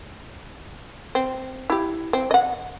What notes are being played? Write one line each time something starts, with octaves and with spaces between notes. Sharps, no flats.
C4
E4 G4
C4
D#5 F#5